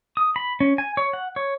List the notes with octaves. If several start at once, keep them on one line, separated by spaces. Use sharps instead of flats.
D#6
B5
C#4
G#5
C#5
F#5
C#5